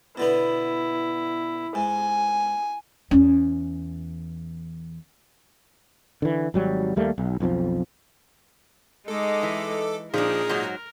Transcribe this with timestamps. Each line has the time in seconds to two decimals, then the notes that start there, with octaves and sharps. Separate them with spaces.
0.17 B2 D3 B3 E4
1.75 G#2 G#5
3.11 E2 C#4
6.22 D3 E3
6.54 G#1 F#3 G3
6.96 D#2 G3 A3 A#3
7.18 B1
7.40 B1 F2 E3 F3
9.08 G#3 D#4 A4 D6
9.43 E3
10.14 A#2 F3 D4 D#4 G#4 A#4 D#6
10.49 G#2 F#3